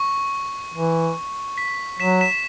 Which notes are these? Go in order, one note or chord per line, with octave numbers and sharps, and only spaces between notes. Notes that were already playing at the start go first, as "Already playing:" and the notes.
Already playing: C#6
E3
B6
F#3 B6 E7
B6 E7
E7